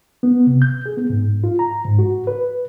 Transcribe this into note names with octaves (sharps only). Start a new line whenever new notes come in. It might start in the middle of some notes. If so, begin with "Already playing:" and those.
B3
C3
G6
G#4
B3
G#2
F4
A#5
G#2
F#4
B4